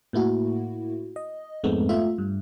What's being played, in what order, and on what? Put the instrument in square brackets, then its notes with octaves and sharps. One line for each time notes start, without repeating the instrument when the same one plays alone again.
[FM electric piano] A2 A#3 E4 F#4
D#5
F2 G#2 G#3 A3 B3 C4
A3 F4 E5
G2